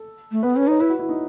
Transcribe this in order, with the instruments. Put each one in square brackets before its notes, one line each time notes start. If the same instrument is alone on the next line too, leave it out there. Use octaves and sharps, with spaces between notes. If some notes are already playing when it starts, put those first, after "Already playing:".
Already playing: [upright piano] A4
[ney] A3
[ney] B3 [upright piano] B4
[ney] C#4 [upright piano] B4
[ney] D#4 [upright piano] C#5
[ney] E4 [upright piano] B4
[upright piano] F#4
E4
D#4